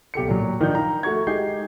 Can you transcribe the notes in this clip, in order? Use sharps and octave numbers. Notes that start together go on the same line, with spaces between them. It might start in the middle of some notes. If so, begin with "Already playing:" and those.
B1 G4 A4 C#7
A#2 F#3
D#3 F3 D4 G6
A#5
A3 F#4 C#6 G#6
G#3 D#4 G4 G6 C7